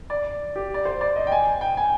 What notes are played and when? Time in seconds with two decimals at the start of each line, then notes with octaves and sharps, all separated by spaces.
0.10 D5
0.56 G4
0.74 D5
0.85 C5
1.01 D5
1.16 D#5
1.27 G5
1.32 G#5
1.61 G5
1.77 G#5